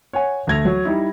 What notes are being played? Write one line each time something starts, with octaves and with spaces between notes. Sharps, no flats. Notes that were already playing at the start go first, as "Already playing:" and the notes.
C#5 F#5 G#5
D2 A3 G#6 A#6 F7
F#3
G3 D#4 E4